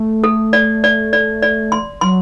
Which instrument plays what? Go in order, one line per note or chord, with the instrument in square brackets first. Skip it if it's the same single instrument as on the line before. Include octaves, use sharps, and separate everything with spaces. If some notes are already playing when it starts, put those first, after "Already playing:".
Already playing: [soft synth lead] A3
[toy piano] A4
D5
D5
D5
D5
C6
[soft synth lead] F#3 [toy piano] C6